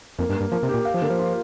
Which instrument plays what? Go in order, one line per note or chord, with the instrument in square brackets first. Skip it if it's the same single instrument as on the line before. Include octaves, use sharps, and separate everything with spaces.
[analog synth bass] F2 [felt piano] A#3
[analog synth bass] G2
[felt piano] A#3
[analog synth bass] G2
[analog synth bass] F3 [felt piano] A#3
[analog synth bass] C3
[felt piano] G4
[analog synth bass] A#2
[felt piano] F5
[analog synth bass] F3
[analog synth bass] D3 [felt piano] A#3
[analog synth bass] F3
[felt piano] F4